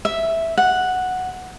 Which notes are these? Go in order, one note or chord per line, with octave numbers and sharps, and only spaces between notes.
E5
F#5